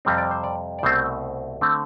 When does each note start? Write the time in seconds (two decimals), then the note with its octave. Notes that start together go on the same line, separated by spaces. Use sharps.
0.05 F2 C3 G3 C4
0.18 D5
0.31 C5
0.44 D5
0.79 D5
0.83 C2 B2 A3 C4 C5
1.61 D3 A3 C4